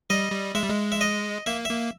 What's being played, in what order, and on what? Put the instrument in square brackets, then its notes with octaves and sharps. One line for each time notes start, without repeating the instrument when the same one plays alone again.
[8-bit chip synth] G3 [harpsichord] D#5
[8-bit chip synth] G3
[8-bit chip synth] G#3 [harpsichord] E5
[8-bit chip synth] G3
G#3
[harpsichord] E5
D#5
[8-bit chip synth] A#3 [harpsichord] E5
[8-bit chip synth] A#3 [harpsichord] E5